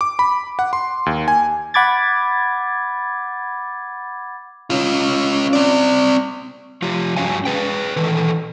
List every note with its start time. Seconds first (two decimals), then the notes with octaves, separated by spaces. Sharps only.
0.01 D6
0.19 B5
0.59 F#5
0.73 C6
1.06 D#2
1.28 G#5
1.74 F#5 B5 D6 G#6 A6
4.70 C#4 F4
5.53 C4 D5
6.82 F3 F4 G4
7.16 G2 C#4 F#4 F5 G#5
7.45 G#4 B4 G5
7.96 D#3 E3 A4